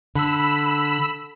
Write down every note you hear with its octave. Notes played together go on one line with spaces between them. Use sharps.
D3 B5 E6